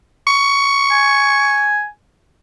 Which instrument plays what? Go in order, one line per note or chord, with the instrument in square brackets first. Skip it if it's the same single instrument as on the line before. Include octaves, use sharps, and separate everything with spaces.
[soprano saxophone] C#6
[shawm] G#5